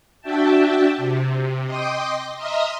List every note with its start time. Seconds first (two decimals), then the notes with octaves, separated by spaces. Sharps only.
0.21 D4 F#4 E5 G5 A5
0.97 C3
1.65 D#5 G5 C6 D6 D#6
2.36 D#5 E5 A#5 C6 D#6 F6